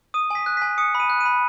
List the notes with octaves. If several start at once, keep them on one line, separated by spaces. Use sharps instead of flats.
D#6 D#7
G#5 B6
F#6
G#5 B6
D#6 C#7
B5
D#7
F#6
B5 D#7